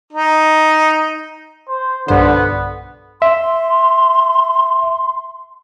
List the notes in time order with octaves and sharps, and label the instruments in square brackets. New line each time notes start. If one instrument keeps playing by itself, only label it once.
[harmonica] D#4
[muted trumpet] C5
[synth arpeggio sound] B1 G2 C5 [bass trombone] D3 [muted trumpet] B3
[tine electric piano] E5 [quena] C6